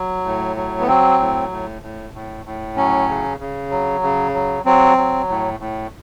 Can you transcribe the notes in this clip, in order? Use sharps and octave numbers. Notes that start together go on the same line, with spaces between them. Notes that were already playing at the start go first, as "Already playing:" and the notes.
Already playing: F#3
A2
F#3
B3
F#3 C4
A2
A2
A2
A2
A2
F#3 C#4
C#3
C#3
F#3
C#3
F#3
F#3 C4
F#3
A2
A2